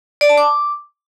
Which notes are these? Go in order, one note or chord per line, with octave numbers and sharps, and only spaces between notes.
D5
A5
D6